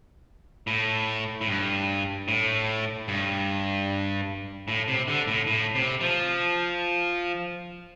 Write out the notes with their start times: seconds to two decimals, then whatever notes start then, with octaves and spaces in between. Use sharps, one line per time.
0.67 A2
1.41 A2
1.47 G2
2.28 A2
3.08 G2
4.68 A2
4.88 C3
5.08 D3
5.27 A2
5.47 A2
5.75 C3
6.01 F3